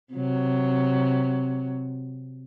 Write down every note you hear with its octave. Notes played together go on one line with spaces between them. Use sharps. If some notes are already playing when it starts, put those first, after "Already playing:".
C3 F#3